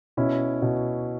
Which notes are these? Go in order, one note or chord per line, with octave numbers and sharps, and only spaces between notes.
B2 C#4 E4
B2